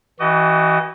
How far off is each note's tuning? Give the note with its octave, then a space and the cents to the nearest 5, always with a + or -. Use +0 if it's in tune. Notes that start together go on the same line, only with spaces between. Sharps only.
E3 -15 F#4 +35 D#5 -20